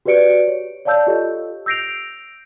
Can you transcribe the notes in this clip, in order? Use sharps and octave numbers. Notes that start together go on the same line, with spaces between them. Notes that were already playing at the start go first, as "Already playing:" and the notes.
F#4 G4 B4 D5 C#7 D7
C#5
C#5 D5 F5 A5 E6 G6
F4 G4 A4 C#5 D#5
E6 G6 A#6 C7 D7 F7